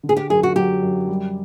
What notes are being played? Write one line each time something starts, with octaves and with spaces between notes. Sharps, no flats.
D3
G#4
G4
F#2 G#4
F#4
F#3 G4
F#2
G3